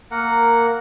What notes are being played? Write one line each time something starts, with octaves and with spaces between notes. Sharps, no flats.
A#3 A#4 F#5